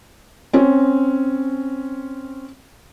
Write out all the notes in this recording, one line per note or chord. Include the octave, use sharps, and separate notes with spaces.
C4 C#4